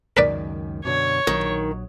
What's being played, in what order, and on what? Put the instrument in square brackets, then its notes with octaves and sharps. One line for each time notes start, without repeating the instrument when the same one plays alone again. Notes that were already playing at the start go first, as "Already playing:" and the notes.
[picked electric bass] C#2 F#2 D#3 [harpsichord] A#4 B4 D5
[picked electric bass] F#2 B2 D3 [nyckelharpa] C#5
[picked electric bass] A#1 F#3 [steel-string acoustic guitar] D#3